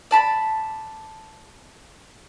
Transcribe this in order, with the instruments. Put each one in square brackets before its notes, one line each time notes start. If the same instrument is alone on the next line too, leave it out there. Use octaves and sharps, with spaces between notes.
[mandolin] D5 A5 B5